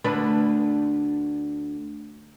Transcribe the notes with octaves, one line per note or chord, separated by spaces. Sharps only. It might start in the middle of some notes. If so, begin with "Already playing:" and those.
D2 D4 B4